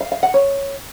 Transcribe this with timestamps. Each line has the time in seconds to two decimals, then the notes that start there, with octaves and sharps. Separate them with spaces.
0.01 F5
0.12 F5
0.23 F#5
0.34 C#5